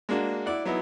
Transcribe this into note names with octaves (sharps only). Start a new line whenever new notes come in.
G#3 A#3 D4 F#4
E4 D5 F#5
F#3 B3 D#4 E4